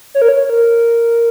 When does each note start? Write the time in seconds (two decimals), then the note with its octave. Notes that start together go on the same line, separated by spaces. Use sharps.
0.15 C#5
0.22 A#4
0.28 C#5
0.50 A#4